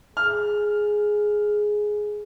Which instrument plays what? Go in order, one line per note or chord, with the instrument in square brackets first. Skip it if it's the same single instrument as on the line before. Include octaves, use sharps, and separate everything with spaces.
[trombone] G#4 [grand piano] F6